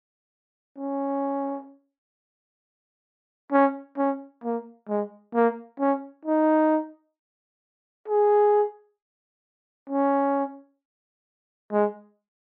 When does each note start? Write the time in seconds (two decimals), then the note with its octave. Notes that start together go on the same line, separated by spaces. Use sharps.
0.78 C#4
3.52 C#4
3.98 C#4
4.44 A#3
4.88 G#3
5.34 A#3
5.80 C#4
6.25 D#4
8.08 G#4
9.90 C#4
11.72 G#3